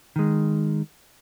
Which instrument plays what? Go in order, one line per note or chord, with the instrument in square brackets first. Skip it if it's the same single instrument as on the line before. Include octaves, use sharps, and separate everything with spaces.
[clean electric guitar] D#3 G#3